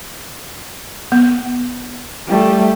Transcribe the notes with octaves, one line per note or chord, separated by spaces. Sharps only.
B3
G3 A3